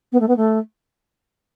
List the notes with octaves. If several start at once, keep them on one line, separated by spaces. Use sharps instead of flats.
B3
A3
B3
A3